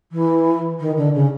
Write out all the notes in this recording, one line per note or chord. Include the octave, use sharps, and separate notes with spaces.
E3
D#3
D3
C#3